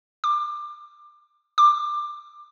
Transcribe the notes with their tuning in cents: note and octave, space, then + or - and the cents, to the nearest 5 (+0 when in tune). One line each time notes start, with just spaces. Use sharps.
D6 +25
D6 +20